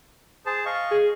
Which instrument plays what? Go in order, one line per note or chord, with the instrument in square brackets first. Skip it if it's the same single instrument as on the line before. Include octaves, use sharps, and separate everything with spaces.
[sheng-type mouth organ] G#4 C5 A5
D#5 F5 C#6
[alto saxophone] G#4